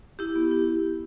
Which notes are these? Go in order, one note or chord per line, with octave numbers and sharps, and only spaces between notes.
E4 G4
B3
E4